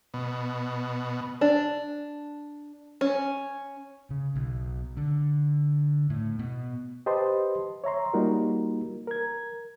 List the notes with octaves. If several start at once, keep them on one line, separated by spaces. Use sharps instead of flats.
B2
D4
C#4
C#3
B1
D3
A2
B2
G4 B4 C5 D#5 A5 C6
C#5 E5 A#5 C6
G3 A#3 D#4 F4 F#4 A#4
A#4 G#6